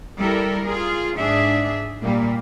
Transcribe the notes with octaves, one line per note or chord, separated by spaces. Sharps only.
G3 E4 A4 A#4
F4 G#4
G#2 D4 G#4 E5
A#2 G3 A#3